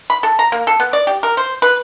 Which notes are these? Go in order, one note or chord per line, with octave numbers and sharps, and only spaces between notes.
B5
A4
A#5
A#3
A4
B3
D5
G4
A#4
C5
B4